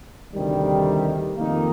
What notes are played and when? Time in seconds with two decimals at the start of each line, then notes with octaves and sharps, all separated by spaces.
0.33 D2 C3 D#3 G3
1.37 F2 D#3 A#3 D#4